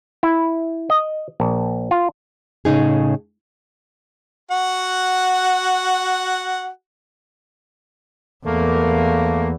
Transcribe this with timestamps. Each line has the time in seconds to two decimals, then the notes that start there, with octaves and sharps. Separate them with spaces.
0.23 E4
0.90 D#5
1.40 A#1
1.91 F4
2.65 A2 C#3 D#4 G#4
4.51 F#4 F#5
8.46 E2 A3 A#3